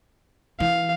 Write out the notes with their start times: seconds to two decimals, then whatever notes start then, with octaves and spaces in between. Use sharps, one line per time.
0.60 E3 F5